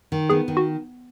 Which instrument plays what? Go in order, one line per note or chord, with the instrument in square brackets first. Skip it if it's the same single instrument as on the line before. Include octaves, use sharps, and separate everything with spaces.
[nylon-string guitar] D#3
[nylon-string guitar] B3 [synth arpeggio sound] G#4
[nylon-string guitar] D#3
[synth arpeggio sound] F#4